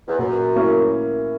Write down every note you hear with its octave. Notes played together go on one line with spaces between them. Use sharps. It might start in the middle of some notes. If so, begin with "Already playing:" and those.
E2
F#2 A#2
A#3 C#4 E4